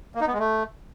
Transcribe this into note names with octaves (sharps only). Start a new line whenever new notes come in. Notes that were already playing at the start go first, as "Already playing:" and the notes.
A#3
D#4
B3
G#3
A3